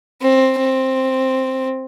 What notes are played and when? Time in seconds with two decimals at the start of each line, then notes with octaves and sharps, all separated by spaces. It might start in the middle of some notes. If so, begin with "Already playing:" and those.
0.21 C4
0.58 C4